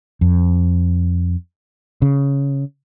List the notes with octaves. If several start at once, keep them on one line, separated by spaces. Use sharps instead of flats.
F2
C#3